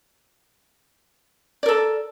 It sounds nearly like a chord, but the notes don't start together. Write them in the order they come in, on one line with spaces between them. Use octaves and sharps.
D5 A#4 A4